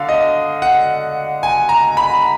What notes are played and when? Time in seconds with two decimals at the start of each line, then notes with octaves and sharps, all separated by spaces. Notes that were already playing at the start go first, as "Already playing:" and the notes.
Already playing: D3 F5
0.09 D#5
0.62 F#5
1.43 G#5
1.69 A#5
1.97 B5